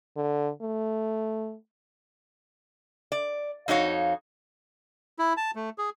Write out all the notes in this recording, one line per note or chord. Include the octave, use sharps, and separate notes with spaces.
D3
A3
D5
F2 D#4 F#4 C#5 F5
E4
A5
A3
G#4